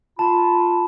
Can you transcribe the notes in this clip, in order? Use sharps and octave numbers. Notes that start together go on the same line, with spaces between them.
F4 A5 B5